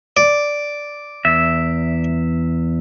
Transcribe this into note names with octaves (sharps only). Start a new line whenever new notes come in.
D5
E2 E5